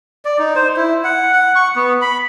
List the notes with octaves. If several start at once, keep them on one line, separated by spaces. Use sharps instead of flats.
D5
D#4
C5
E4
F#5
F#5
C#6
B3
B5